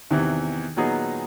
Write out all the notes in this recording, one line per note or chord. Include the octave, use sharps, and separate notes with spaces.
E2 C3 D#3 E3
A#2 F#3 B3 D#4 G#4